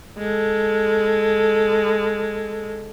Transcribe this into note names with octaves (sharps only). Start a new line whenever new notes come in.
G#3 A4